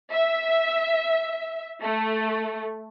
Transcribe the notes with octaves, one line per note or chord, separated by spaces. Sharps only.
E5
A3